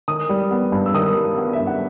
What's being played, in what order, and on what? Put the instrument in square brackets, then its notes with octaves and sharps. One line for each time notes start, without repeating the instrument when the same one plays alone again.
[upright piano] D#3 D#6
G3
B3
G2
E6
D#3 D#6
G3
B3
E5
G2
F#5